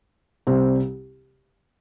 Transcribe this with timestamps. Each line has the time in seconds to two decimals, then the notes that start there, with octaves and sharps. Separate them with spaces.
0.47 C2 C3 G3 C4